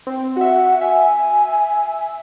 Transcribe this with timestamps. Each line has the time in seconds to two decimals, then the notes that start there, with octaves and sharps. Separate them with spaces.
0.07 C4
0.37 F#4 E5 F#5
0.81 E5 G#5